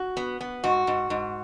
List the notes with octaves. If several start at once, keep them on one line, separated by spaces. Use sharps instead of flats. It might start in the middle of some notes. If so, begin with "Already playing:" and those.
Already playing: F#4
B3
B3
G#2 F#4
G#2
G#2